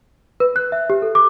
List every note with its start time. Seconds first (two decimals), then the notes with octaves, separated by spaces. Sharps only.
0.40 B4
0.56 F#6
0.72 E5
0.90 G4
1.02 A4
1.15 D6